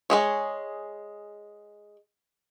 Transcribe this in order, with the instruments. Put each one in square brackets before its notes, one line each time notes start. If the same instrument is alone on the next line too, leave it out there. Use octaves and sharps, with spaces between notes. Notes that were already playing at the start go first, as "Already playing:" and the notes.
[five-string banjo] G#3 G#4 C#5